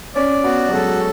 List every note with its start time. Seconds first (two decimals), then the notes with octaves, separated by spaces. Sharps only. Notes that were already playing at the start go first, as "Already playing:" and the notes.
0.15 C#4 D5
0.44 B3 F#4
0.69 F#3
0.73 G#3 A4